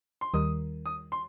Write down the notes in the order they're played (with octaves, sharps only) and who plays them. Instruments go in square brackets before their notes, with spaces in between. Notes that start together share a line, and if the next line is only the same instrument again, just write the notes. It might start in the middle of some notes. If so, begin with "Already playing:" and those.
[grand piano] C6
[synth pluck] D#2 D#3 G3 D#4 A#4 [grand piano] D#6
[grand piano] D#6
C6